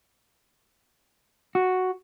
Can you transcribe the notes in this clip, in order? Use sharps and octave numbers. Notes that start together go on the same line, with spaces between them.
F#4